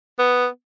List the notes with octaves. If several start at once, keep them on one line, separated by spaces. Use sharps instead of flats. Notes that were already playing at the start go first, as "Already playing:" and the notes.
B3